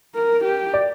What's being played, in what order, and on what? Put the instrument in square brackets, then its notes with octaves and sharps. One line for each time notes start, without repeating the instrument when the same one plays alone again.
[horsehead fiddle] A#4
G4
[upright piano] D5